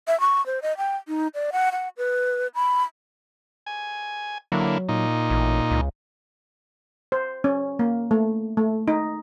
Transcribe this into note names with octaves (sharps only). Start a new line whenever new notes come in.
E5
C#6
C5
D#5
G5
D#4
D5
F#5
F#5
B4
B5
G#5
D3 F#3 A#3 E4
A#2 D#4
A1
C#2
C5
C#4
A#3
A3
A3
D#4